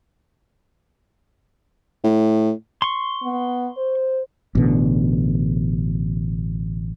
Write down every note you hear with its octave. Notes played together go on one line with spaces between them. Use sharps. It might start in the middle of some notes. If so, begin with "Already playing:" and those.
A2
C6 C#6
B3
C5
A1 B2 D3